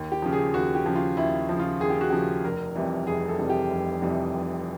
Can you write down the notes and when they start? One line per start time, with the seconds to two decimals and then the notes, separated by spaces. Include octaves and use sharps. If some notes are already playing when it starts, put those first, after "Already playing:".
Already playing: D#2
0.12 G4
0.22 C#3 F3
0.33 G#4
0.54 D#2 F#4
0.75 G4
0.86 C#3 F3
0.96 F4
1.17 D#2 E4
1.49 C#3 F3
1.59 F4
1.80 D#2 G#4
1.90 G4
2.01 F#4
2.10 C#3 F3 G4
2.44 F1 A#4
2.75 F2 C3 E3 G3
3.07 F1 G#4
3.28 A4
3.39 F2 C3 E3 G3
3.49 G4
3.70 F1
4.02 F2 C3 E3 G3
4.34 F1